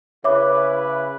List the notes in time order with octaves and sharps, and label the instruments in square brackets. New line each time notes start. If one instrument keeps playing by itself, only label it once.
[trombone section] C#3 E4 B4 [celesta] C#5 E5 D6